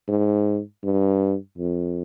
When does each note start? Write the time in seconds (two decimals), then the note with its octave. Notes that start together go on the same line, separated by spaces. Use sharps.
0.09 G#2
0.84 G2
1.58 F2